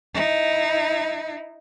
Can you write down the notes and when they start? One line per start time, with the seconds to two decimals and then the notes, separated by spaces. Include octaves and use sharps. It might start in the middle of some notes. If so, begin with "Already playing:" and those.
0.14 D#4 E4